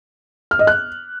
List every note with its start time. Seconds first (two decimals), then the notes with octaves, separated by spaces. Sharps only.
0.51 F6
0.59 D#5
0.67 F#6